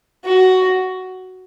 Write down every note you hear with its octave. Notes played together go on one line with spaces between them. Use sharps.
F#4